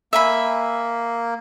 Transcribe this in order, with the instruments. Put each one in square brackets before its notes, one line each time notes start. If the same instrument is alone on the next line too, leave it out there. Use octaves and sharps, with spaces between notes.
[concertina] A#3 [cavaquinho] E5 G#5 B5